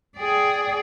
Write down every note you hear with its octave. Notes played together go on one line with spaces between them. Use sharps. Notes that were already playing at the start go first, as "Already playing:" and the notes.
G#4 D5 G5